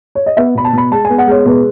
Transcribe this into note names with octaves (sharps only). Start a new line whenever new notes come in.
C#5
D#5
B3 E5
B2 B5
A5
B2 B5
G#3 A5
G#5
B3
F#5
G#3 C#5
B2 B4